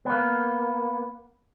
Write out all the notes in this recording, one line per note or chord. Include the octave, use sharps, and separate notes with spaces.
A#3 B3